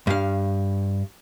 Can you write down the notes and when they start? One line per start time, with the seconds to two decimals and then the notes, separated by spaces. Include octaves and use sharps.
0.07 G2 F5